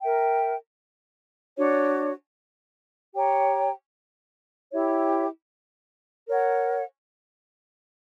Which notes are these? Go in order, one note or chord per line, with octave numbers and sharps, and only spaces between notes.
A#4 E5 G5
D4 F#4 C#5
G4 C#5 G5 A#5
E4 G4 C#5 E5
A#4 C#5 F#5